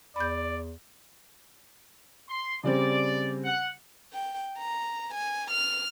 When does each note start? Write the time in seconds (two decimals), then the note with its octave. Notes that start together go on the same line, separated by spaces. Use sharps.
0.16 E2 D5 B5 G6
2.28 C6
2.64 C#3 G3 C4 D5
3.44 F#5
4.13 G5
4.58 A#5
5.14 G#5
5.50 F6